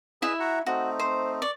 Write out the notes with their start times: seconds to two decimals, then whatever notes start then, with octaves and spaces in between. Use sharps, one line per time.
0.22 E4 G#4 B4 D#5 E5
0.40 F#4 F#5 A#5
0.66 A3 C4 D#4 F#4
0.99 C5
1.42 D5 C#6